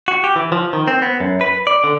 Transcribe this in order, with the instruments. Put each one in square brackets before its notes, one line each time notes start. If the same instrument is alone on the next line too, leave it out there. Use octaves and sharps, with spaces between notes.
[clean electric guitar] F#4
G4
E3
F3
D#3
C4
B3
F#2
B4
D5
D3